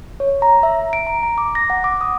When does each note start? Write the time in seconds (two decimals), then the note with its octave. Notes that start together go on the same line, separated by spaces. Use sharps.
0.20 C#5
0.42 A#5
0.63 E5
0.93 D7
1.07 A#5
1.23 A#5
1.38 D6
1.55 A#6
1.70 F#5
1.84 D6
2.01 D#6